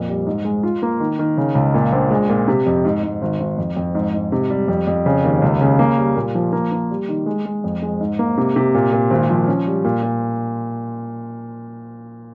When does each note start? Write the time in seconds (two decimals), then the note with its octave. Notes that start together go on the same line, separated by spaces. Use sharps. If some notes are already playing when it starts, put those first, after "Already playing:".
Already playing: F2 A#2
0.09 G3
0.26 G#2
0.45 G#3
0.63 F4
0.82 A#3
1.00 D#3
1.19 D#3
1.37 C#3
1.55 C#2
1.74 A#2
1.93 A#1
2.11 G#3
2.29 A#2
2.48 C3
2.66 F2
2.85 G#2
3.03 G#2
3.22 G#1
3.40 G#1
3.58 F2
3.77 F2
3.95 G#2
4.14 G#2
4.32 C3
4.50 G3
4.68 F2
4.87 F2
5.06 C#3
5.24 D#2
5.42 C#2
5.61 C#3
5.79 A#3
5.97 G3
6.16 A#2
6.35 F3
6.52 A#3
6.72 A#3
6.90 G3
7.09 D#3
7.26 G#3
7.46 G#3
7.64 F2
7.82 G#3
8.00 G#2
8.19 A#3
8.38 C3
8.56 C3
8.74 A#2
8.92 A#2
9.10 G#1
9.30 F3
9.48 C#4
9.67 G3
9.84 A#2
10.03 A#2